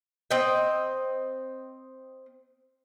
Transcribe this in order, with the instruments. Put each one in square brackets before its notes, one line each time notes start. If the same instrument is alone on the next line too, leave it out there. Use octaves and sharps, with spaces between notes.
[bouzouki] C4 D#5 G5